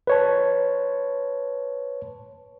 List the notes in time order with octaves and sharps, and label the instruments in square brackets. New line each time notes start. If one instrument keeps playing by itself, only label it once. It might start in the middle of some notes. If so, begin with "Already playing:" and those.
[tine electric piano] B4 C#5 A5